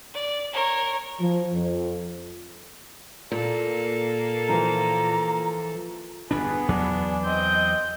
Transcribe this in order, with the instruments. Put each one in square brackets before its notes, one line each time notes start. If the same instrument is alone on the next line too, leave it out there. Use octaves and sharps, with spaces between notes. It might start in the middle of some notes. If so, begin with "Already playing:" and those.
[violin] D5
A#4 C#5
[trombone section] F3
F2
[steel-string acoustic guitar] A#2 [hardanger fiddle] A#3 A4
[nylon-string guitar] E3 F3 A#4 [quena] A#5
[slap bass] G1 F2 D4 [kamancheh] B3 G#4 [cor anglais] B4
[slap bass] E2 F#3 [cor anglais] D4
[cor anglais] C4 [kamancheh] D#5 [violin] G6